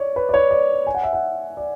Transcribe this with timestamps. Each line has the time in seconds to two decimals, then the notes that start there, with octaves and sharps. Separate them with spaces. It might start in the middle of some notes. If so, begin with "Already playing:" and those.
Already playing: C#5 D5
0.16 B4
0.29 D5
0.34 C#5
0.51 D5
0.87 G#5
0.95 F#5
1.03 E5
1.13 F#5
1.57 D5